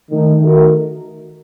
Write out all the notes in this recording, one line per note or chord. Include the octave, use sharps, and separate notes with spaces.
D#3 A3 D#4
D#3 A3 D#4 F#4 A#4